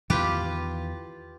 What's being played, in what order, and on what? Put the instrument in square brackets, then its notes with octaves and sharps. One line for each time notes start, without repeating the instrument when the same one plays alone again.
[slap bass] E2 D#3 E3 [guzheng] F4 G4 B4